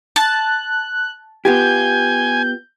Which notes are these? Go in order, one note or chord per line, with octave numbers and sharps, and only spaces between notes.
A5 F#6
B3 F4 G4 G#5 G6